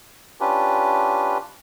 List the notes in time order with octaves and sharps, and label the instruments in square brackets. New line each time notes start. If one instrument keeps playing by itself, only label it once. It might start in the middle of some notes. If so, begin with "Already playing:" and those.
[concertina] C#4 D4 F4 G4 B4